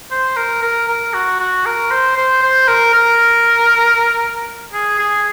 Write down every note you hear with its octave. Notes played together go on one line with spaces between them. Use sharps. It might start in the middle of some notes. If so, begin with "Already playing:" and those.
C5
A#4
A#4
A#4
F#4
F#4
A#4
C5
C5
C5
A#4
A#4
G#4
G#4